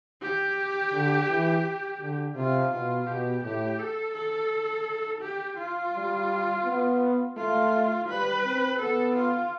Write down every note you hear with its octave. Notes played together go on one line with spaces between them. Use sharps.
G4
D3
E3
D3
C3 F4
B2 F4
B2 G4
A2 G4
A4
A4
G4
F4
G3
B3
A3 F4
G3 B4
C4
B3 A4
F4